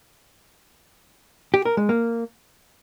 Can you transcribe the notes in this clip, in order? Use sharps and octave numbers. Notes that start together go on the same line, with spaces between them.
G4
A#4
G#3
A#3